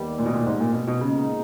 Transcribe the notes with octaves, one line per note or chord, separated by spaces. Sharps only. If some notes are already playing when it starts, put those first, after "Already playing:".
Already playing: D#2 D#3 G3 B3
A#2
B2
A#2
G#2
A#2
B2
B2
A#2 C#3 G#3 B3 D#4